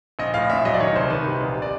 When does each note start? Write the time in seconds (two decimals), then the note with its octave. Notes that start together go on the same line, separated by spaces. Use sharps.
0.19 A#1 D#5
0.34 A2 F5
0.50 A#1 E5
0.65 F#3 D#5
0.74 D5
0.80 D#3 C#5
0.96 C2 C5
1.10 D#3 B4
1.26 C3
1.41 A#1
1.62 D5